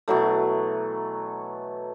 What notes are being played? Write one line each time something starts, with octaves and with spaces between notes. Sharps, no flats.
B2 E3 F#3 A3